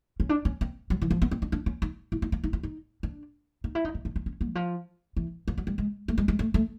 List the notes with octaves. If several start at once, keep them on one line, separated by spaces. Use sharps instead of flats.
C#4
D4
C#4
C4
F#3
E3
F3
B3
C4
D4
D4
C#4
D#4
E4
D#4
D4
D#4
E4
D#4
D4
D#4
E4
D#4
E4
D4
D#4
C#4
B3
E3
F3
E3
F3
F#3
G3
G#3
A3
G#3
G#3
A3
A3